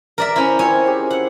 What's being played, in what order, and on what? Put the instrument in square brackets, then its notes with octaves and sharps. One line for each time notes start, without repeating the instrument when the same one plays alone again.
[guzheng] A#4 D5 E5
[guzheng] C#4 E4 [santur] C5
[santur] C4 F4 E5 [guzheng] C#5 G#5
[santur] G4 G#4 C5
[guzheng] F#5